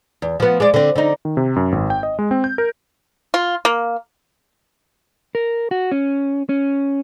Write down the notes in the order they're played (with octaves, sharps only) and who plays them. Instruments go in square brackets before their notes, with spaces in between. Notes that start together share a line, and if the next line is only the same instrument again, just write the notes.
[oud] E2
F3 B3
G#3 D5
D3 C4
D3 D#4
[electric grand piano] D#3
C3
F#2
G#1
G5
D#5
G#3
C4
G6
A#4
[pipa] F4
A#3
[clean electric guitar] A#4
F#4
C#4
C#4